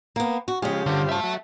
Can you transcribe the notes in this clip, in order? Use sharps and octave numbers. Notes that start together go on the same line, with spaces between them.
A#3 B3
F#4
C#3 F3 G#3 G4
G2 D3 F4 C5
E5 A5
F#3